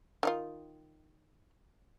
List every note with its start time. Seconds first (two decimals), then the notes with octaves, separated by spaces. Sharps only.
0.23 D#3 D#4 F4